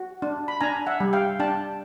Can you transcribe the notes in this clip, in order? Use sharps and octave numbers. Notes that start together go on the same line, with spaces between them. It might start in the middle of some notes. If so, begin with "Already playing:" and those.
Already playing: F#4
D4
B5
D4 G#5 A#5
E5 F#5
G3
F5 G5
D4 G5 A5